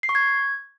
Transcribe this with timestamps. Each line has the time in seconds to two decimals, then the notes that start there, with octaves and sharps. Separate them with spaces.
0.03 C7
0.09 C#6
0.15 G#6